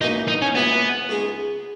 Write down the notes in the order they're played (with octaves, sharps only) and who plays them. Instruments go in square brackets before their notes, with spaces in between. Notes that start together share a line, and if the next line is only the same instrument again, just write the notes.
[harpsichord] C#2 B2 A#3 C#4 E4 [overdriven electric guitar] D#4
[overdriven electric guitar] D#4
C#4
[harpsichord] C#2 B2 A#3 C#4 E4 [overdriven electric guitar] B3
[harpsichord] C#2 C#3 G#3 D#4 G#4